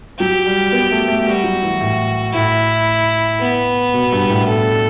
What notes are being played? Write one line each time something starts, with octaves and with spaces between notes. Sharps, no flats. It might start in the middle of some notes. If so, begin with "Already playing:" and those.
F#3 G4
G3
B3
A3
A3
G3 F#4
F#3
E3
A2
A2 E4
B3
B2
G2
A2
A4